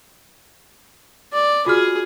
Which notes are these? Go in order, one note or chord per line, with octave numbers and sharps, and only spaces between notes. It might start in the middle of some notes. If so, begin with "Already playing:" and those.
D5
F4 F#4 G#4 F6